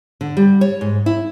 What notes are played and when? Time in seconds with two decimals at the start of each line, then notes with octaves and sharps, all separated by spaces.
0.21 D3
0.37 G3
0.61 C#5
0.81 G#2
1.06 E4